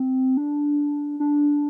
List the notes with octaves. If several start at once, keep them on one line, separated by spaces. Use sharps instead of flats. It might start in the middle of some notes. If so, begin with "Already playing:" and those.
Already playing: C4
D4
D4